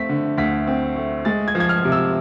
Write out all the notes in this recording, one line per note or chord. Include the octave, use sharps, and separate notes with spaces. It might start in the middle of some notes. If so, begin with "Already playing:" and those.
Already playing: A3 C4 B6
D3
D2 B6
C4
A3
G#3 A6
G#6
F3
G#6
F6
C3
E6